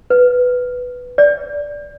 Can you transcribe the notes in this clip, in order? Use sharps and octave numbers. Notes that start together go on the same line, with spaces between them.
B4
D5